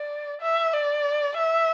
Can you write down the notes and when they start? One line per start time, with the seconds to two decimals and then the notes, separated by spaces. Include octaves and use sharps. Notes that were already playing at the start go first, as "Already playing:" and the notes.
Already playing: D5
0.41 E5
0.73 D5
1.37 E5